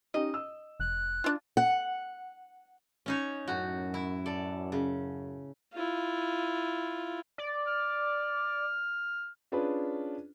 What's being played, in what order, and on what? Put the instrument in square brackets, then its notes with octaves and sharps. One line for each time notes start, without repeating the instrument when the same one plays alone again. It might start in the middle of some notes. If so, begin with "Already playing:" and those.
[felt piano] C#4 D#4 G4 [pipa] D#5
[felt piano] E6
[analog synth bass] F1 [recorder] F#6
[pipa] D4 F4
[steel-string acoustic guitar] F#5
[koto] C#4 D#4 C#5
[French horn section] F#2 [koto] A2 F#4
[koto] E4
A4 D5
C#3
[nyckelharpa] E4 F4
[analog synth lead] D5
[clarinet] F6
[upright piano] C#4 D4 F4 G#4 B4